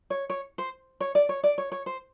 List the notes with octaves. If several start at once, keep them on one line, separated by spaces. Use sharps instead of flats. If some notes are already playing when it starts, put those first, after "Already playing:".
C#5
C#5
C5
C#5
D5
C#5
D5
C#5
C#5
C5